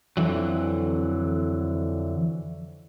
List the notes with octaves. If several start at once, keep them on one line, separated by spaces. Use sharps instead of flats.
F2 D3 E3 F#3